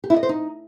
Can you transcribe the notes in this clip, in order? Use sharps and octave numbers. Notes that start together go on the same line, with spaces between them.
G4
E4
D#5
C5
D#4